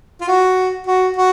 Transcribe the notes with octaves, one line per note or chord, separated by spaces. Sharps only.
F4
F#4
F#4
F#4